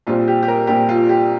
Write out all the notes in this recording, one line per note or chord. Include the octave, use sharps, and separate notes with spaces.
A#1 A#2 G3 C4 F4
G4
G4
A#4
A#1 A#2 G3 C4 G4
F4
G4